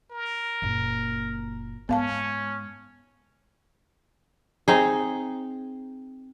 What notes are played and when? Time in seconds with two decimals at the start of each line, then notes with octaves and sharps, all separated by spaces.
0.11 A#4
0.62 F#1 A#2
1.89 G#2 B3 C#4 F5 A5
4.68 C4 D#4 G#4